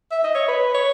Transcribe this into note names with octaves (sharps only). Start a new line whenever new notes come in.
E5
D#5
C#5
B4
C#5